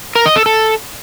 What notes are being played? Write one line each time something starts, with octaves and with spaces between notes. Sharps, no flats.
A#4
D#5
A4
A4